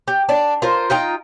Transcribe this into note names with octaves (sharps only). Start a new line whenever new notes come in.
G4
D4 D5
F4 A#4 C5
D#4 F4 G5 A#5